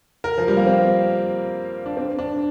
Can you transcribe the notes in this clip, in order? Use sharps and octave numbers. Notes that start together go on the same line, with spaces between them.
A#4
F3
G3
A#3
C4
D4
C4
D4